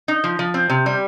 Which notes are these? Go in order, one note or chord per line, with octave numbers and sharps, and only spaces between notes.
D#4
F3
F3
C4
C3
G3